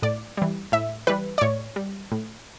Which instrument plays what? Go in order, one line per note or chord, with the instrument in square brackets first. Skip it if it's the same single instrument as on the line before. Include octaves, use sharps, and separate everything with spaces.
[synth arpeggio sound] A2 D5
E3 G3
A2 E5
E3 G3 B4
D5
A2 C#5
G3
A2